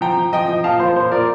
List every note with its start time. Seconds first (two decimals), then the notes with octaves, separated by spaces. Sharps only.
0.01 F3 G5 A#5
0.17 F3
0.33 F3 D#5 G5
0.48 F3
0.64 A#2 F5 A5
0.80 F3 C5
0.96 A#2 C5
1.12 A#2 A#4 D5